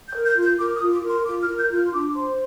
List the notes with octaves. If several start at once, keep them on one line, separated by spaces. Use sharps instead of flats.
G6
A#4
G6
F4
G6
A#4 D6
D#6
F4
D6
A#4
C6
F4 D6
F6
A#4
G6
F4 G6
F6
C6
D4 D6
C5 C6